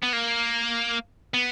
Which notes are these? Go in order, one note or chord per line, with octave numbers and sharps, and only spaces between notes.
B3
A#3
B3